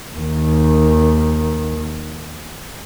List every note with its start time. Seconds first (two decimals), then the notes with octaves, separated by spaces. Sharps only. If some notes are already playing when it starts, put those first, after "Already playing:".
0.16 D#2 D#3